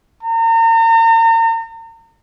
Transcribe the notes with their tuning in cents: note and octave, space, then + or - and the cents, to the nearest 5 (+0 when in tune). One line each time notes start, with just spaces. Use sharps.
A#5 -40